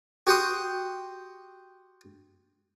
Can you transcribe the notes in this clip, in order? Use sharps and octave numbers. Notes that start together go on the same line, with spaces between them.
F#4 G4 F#5 G5 C6 D#6